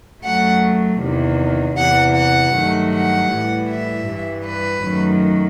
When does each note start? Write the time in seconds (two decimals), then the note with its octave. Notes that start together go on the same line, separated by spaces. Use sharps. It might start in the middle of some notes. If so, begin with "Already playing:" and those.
0.23 F#2 F#3 A3 F#5
1.00 E2 C3 D#3
1.77 E2 C3 E3 F#5
2.15 F#5
2.54 G2 D#3 F#3 A3
2.93 F#5
3.30 A2 E3 G3
3.69 E5
4.07 G2 E3 G3
4.45 B4
4.84 F#2 D#3 F#3 A3